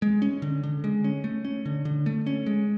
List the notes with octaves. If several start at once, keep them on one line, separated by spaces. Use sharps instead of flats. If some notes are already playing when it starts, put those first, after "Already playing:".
G#3
C#4
D3
D3
G#3
C#4
A3
C#4
D3
D3
A3
C#4
G#3